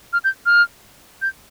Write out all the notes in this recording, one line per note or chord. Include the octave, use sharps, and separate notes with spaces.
F6
G6
F6
G6